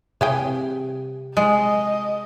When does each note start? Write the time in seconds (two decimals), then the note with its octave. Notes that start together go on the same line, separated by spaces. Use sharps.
0.21 C3 E3 G#4 G5
1.37 G#3 D#5